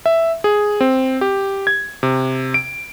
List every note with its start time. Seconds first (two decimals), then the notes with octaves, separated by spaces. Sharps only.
0.06 E5
0.44 G#4
0.81 C4
1.21 G4
1.67 G#6
2.03 C3
2.54 D7